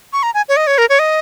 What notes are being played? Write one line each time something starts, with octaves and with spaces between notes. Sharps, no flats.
C#6
A#5
G#5
C#5
D#5
C#5
A#4
C#5
D#5